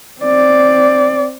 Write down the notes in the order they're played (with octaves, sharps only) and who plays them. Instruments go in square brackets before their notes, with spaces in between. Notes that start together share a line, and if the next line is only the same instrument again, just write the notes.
[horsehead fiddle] C4 D5